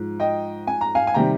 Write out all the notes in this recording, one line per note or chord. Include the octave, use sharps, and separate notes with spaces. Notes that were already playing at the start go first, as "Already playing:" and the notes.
Already playing: G#2 F3
D#5 G5
G#5
A#5
F5 G#5
G#5
C3 D#3 G3 G5 A#5